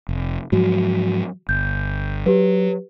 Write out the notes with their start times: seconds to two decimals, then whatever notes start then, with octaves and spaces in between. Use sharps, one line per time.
0.09 F1
0.52 G#2 F3 F#3 F#4
1.49 G1 G6
2.26 F#3 G4 B4